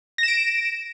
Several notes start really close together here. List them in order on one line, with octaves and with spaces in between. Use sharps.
A#6 E7 D7